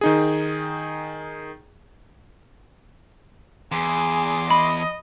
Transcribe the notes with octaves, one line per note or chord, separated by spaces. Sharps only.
D#3 D#4 G#4
E2 G#4 C6 D6
D#5 B5